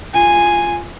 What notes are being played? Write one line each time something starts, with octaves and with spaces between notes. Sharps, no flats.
F4 G#5